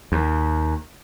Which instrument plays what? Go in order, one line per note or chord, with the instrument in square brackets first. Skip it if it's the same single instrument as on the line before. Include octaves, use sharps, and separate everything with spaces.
[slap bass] D#2